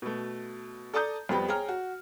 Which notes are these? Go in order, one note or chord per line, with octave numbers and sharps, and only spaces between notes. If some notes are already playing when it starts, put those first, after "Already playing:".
B2 A3
A4 D5 A5 A#5 D#6 G6
F2 G3 B3 G5
G#4 C#5 G5 A#5 F6
F#4